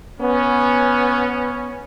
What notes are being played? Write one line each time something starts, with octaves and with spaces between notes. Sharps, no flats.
B3 C#4